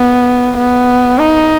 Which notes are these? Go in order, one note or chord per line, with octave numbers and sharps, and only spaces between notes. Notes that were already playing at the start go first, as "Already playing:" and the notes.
Already playing: B3
B3
D#4